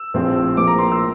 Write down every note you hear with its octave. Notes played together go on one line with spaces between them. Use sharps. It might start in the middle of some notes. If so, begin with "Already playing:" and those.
Already playing: E6
A#1 A2 F3 C4
A#1 A2 F3 A#3 D6
A#5
C6
E6